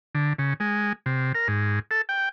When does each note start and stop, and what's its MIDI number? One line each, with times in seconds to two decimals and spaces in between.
0.15 0.33 50
0.39 0.54 49
0.60 0.93 56
1.06 1.32 48
1.35 1.48 70
1.48 1.79 44
1.91 2.02 69
2.09 2.29 79